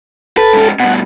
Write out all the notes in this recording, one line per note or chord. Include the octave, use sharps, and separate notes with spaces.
A4 B4 A5
G#2 C#4
G2 B2 F#5